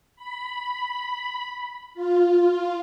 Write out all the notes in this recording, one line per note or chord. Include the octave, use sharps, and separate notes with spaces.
B5
F4